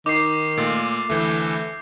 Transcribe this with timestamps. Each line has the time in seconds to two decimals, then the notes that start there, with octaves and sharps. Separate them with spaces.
0.06 D#3 D#4 D6 C7
0.58 A#2 A3 F4
1.09 D2 E3 A3 G6